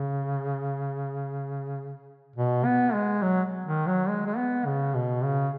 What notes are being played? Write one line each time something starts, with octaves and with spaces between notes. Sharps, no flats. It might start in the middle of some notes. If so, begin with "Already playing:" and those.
Already playing: C#3
B2
B3
G#3
F#3
D#3
F#3
G#3
G#3
B3
C#3
B2
C#3